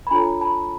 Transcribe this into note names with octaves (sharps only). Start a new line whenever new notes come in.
B5
D4 F4 A4 C#5 G#5 A#5
A5 B5